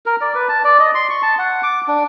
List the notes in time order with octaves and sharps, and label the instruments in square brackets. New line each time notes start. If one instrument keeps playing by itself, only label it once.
[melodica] A#4
D5
B4
A5
D5
D#5
C6
C#6
A5
F#5
D6
D4